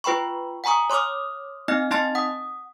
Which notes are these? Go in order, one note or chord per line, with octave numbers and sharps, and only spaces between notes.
F4 B4 G5 B5 C#6
F#5 G#5 A#5 C#6 D#6
C#5 C6 D6 D#6 F6
C4 D#4 D#5 F6
C4 D#4 D#5 A5 C6 A6
F#5 D#6